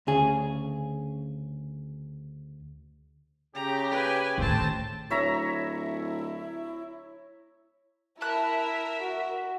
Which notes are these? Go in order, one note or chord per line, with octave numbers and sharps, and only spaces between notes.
D2 C#3 G#4
C#3 G4 A#5
B4 G#5
A2 D#3 C4 C5 A5
D1 E4 C#5 E5 A#5
E4 A#4 E5 A5 B5 F#6
F#4